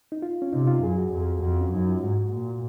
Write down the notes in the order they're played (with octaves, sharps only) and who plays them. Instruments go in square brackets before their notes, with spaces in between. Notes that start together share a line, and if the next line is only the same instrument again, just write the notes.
[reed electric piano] D#4
F4
C#4
[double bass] C3 [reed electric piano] D#4
[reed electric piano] F4
[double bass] F#2 [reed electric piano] G#4
[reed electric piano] F#4
[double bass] F2
[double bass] F2 [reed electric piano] F#4
[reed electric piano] C#4
[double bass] F#2 [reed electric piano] D#4
[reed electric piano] F4
[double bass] G#2 [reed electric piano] F#4
[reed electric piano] F#4
[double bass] A#2